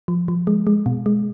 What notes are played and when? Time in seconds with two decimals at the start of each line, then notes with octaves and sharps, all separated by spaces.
0.08 F3
0.28 F3
0.47 G#3
0.67 G#3
0.86 B2
1.06 G#3